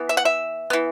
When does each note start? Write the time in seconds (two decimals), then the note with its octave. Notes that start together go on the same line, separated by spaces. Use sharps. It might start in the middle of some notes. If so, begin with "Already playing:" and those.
Already playing: E3 B3
0.09 E5
0.17 F#5
0.25 E5
0.70 E3 B3